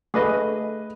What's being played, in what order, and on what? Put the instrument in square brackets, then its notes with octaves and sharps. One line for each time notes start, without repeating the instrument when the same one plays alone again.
[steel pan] A3 [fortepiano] G#4 B4 D#5